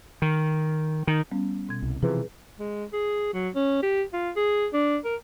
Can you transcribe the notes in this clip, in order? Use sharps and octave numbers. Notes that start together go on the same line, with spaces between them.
D#3
D#3
G3 B3 C#4
B2 G#6
C2
C3 E3 F3 G#4 B4
G#3
G#4
F#3
C#4
G4
F4
G#4
D4
A#4